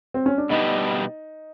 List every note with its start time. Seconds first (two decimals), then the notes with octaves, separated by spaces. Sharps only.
0.14 C4
0.26 C#4
0.38 D4
0.50 B2 G3 B3 D4 D#4 G4